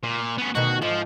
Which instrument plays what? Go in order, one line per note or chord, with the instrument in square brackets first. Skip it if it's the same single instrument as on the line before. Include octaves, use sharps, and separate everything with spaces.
[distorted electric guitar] A#2
B3 C#4
[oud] D2 B2 D#3 [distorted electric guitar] F#4
[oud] G#2 [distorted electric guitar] F3